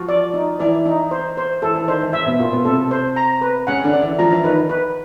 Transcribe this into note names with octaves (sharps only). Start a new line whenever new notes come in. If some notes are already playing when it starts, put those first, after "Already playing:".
Already playing: F3 F4 F#4
D5
D#4
E3 E4 D5
D#4
C5
C5
E3 E4 A4
E3 E4
D#3 D#4 C5
E3 E4
C#3 C#4 E5
B2 B3
A#2 A#3 F4
B2 B3
C3 C4 A4
C5
A#5
B4
C#3 C#4 F#5
D3 D4
D5
E3 E4
F3 F4 A#5
E3 E4
D#3 D#4 B4
B4